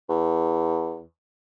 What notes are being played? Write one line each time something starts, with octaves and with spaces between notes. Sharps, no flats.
E2